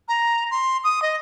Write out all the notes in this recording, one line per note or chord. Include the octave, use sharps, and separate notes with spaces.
A#5
C6
D#6
D#5